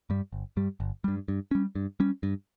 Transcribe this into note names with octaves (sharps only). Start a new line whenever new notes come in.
G2 G3
G1
G2 G3
G1
G2 G3
G2
G3 C#4
G2
G3 C#4
G2